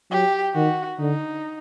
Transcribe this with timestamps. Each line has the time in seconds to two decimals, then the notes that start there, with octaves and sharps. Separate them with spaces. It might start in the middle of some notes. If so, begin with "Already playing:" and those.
0.11 F#3 G4
0.55 D#3 F#4
0.99 D3 D#4